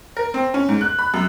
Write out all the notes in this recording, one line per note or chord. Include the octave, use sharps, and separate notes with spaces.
A#4
C4
C#4
G#2
F#6
B5
F#2